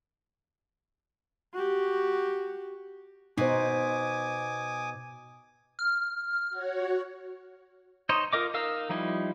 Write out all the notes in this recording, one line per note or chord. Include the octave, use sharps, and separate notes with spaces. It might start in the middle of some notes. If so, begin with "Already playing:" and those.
F#4 G4
B2 D#4 C5 G#5 D6 D#6
F6
F#4 C#5
D#4 C5 C#5 D#5
F4 A#4 D#5 D6
D#4 A#4 F5 E6
F3 G3 D#4 E4